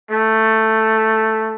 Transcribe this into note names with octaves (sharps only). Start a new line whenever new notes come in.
A3